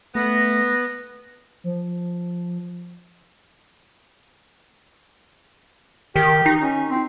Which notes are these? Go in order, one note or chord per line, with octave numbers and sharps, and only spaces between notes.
A3 B3 A#6
F3
D#3 G4
D#4
C#4
C4